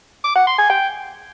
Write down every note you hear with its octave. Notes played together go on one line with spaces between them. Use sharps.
D6
F#5
C6
G#5
G5